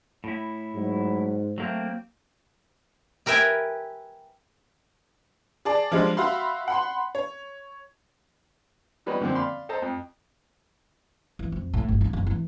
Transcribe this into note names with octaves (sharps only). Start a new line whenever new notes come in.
A2 E4
G#2 F#3
F#3 A3 A#3 C4
G4 A#4 B4 E5 G5 G#5
G#4 D5 A5
F3 G3 G#3 D4
F#4 E5 F5 B5 C6
F#5 B5 C6
C#5
F3 G3 B3 C#4 B4 D#5
A#2 D3 D#3 F3 C4
D5 F5 B5 C6
A4 C5 D#5 A5 A#5
F2
E3
F2
A2
G1
E4
F#1
E3